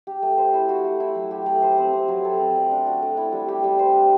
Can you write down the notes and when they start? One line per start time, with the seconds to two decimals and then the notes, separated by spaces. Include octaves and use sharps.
0.07 G4
0.23 A3
0.38 C5
0.54 E4
0.69 F#4
0.84 A3
1.00 E4
1.15 F#3
1.31 G4
1.46 A3
1.62 C5
1.78 C4
1.93 C4
2.08 F#3
2.25 A4
2.40 C4
2.56 D5
2.71 D4
2.87 F#4
3.02 A3
3.17 E4
3.33 G3
3.48 G4
3.64 G3
3.79 C5
3.94 D4